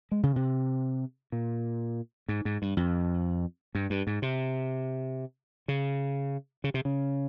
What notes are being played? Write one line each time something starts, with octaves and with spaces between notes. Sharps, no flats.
G#3
C#3
C3
A#2
G#2
G#2
G2
F2
G2
G2
G#2
C3
C#3
C#3
C3
C#3